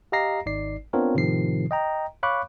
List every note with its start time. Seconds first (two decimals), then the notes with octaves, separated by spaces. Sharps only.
0.12 G4 D#5 F5 A#5 A#6 C7
0.46 G#1 D#4 D5 C7
0.93 B3 C4 D4 F4 A#4 C#5
1.15 A2 C3 D#3 F3 C7
1.71 D#5 G5 A#5
2.23 C#5 F5 B5 C#6 D6 F#6